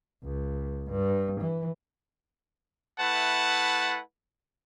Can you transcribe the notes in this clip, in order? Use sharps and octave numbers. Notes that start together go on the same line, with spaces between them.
C#2
G2
E3
A3 E4 B4 F#5 A5